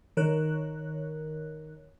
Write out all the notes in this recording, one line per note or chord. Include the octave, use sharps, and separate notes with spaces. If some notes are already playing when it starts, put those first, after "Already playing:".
D#3 A#4 C#5 F#6